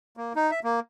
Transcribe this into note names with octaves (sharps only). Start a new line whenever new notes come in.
A#3
D#4
E5
A#3